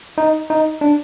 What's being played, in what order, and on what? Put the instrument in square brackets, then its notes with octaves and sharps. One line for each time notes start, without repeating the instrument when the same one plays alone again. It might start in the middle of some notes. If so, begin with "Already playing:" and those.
[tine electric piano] D#4
D#4
D4